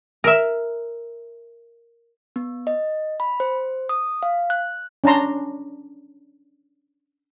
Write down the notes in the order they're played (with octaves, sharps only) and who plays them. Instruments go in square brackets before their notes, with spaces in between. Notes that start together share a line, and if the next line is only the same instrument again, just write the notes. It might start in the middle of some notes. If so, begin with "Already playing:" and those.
[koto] A#4 E5
[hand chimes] B3
D#5
B5
C5
D#6
F5
F#6
[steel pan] C#4 D4 A5 A#5 C6